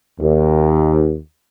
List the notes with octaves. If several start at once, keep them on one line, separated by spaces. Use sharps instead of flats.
D#2